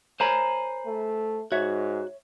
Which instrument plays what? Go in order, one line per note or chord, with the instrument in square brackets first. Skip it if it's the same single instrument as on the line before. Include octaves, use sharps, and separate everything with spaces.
[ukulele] A#4 C#5 A#5 [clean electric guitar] C5 G#5 B5
[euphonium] A3
[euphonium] G#2 [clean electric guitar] F#4 [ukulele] C#5 E5